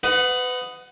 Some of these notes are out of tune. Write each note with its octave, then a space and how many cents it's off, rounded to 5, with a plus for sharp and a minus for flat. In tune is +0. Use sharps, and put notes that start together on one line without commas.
B4 +30 D#5 +0 F#5 -10